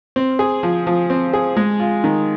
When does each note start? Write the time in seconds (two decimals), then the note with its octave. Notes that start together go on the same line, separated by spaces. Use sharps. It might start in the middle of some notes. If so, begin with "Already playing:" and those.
0.16 C4
0.39 G#4
0.63 F3
0.87 F3
1.10 C4
1.33 G#4
1.57 G#3
1.80 F4
2.04 D#3